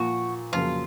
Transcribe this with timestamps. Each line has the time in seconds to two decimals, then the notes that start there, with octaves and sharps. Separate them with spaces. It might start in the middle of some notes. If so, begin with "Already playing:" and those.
Already playing: A#2 F3 A#3 F#4
0.52 F2 C#3 F#3 A#3 F4